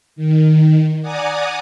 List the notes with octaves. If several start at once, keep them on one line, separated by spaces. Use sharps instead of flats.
D#3
D5 F#5 G#5 A#5 D6 D#6